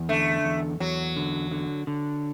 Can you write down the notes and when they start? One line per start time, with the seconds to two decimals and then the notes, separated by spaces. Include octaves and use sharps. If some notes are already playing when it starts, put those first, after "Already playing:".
Already playing: E2
0.09 D3 A3
0.45 E2
0.80 E2 F#3
1.16 D3
1.51 D3
1.87 D3